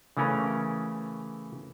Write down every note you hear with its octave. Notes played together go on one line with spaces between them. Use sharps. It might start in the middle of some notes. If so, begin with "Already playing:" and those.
C#3 E3 A3 C#4 A#4